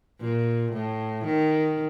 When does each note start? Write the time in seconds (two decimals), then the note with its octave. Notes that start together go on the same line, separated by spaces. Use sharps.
0.20 A#2
0.73 A2
1.25 D#3